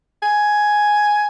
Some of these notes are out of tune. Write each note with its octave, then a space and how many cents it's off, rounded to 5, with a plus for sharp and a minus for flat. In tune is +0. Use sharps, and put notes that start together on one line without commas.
G#5 +5